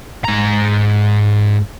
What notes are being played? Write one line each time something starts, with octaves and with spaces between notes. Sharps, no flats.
G#2 A#5